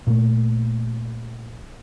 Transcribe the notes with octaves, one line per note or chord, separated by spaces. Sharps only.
A#2 A3